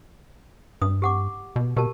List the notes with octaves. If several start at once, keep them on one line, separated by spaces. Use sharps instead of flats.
G2 D#6
G4 F#5 D6
B2
B2 G4 A#4 A5